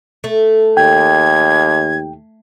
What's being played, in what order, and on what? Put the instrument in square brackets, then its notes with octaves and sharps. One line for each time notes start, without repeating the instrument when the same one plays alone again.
[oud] A3
[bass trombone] D#2 [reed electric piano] G5 [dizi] G#6